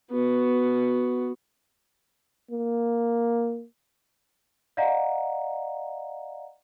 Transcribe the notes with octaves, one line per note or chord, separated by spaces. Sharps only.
B3 F#4
A#3
D5 D#5 F5 F#5 A#5